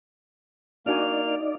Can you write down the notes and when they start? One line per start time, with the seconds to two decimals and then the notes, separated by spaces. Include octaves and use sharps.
0.86 A#3 D4 D#4 F#4 D5 G#5 F6